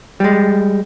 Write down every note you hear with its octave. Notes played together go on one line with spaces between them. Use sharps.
G3 G#3